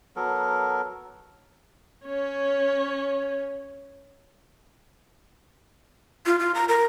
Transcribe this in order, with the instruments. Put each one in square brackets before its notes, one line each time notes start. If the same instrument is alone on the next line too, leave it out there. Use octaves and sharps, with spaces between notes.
[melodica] F#3 B3 A4 A#4
[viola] C#4 C#5
[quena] F4
F4
A#5
A#4